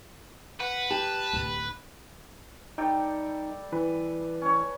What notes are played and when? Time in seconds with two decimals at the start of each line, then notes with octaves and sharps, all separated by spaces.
0.60 B4 F#5
0.90 G4 A5
1.33 D1 D3
2.78 G3 D#4 A4 G5
3.72 E3 B4
4.42 C#4 C#5